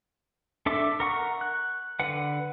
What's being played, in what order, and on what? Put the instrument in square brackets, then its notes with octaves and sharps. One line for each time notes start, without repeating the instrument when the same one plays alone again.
[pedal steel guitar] D4 A4 E5 D6
A#4 F#5 C#6
F#6
D3 B4 F#5